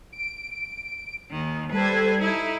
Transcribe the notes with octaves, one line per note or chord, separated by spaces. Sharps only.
D7
D#2 D#3
G3 A4 B4 C5 G#6
D#4 E4